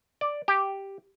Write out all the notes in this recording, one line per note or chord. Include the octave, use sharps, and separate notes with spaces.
D5
G4